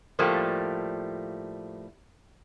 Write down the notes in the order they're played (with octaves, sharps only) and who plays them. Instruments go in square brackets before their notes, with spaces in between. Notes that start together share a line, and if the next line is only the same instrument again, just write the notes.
[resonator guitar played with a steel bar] A2 F3 G3 A3 A#3